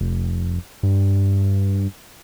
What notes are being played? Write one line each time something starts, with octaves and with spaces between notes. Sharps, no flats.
F1
G2